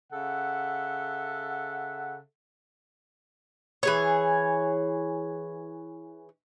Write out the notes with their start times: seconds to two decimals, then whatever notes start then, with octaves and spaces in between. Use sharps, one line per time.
0.13 C#3 A4 E5 F#5
3.83 E3 G#4 C#5